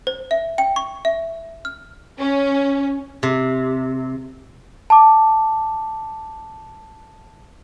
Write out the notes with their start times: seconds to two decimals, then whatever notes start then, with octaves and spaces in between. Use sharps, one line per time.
0.07 C5
0.31 E5
0.58 G5
0.76 C#6
1.05 E5
1.65 F6
2.17 C#4
3.23 C3
4.90 A5 D6